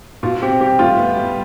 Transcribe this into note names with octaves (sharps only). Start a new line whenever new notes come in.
B2 F4
C4 G4
G3 G4
A2 F4
B3
G3